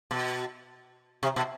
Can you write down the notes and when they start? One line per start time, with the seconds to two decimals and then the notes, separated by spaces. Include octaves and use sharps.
0.11 B2
1.23 C3
1.36 B2